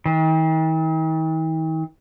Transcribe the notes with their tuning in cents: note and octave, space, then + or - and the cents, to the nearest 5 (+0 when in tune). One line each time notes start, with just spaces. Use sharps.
D#3 +45